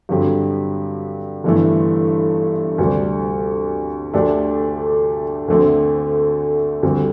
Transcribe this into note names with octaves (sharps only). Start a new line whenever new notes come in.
G2 D3 F#3 C4 G4
G1 G2 E3 A3
D2 C3 G3 D4
D2 D3 A3 D4 G4
D2 D3 A3 C4
D2 D3 G3 C4